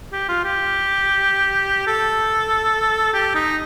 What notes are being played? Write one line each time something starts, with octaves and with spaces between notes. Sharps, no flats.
G4
F4
G4
A4
G4
D#4